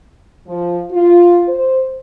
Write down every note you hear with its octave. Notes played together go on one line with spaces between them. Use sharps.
F3
F4
C5